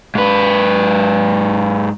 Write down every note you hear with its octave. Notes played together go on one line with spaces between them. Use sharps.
G#2 B4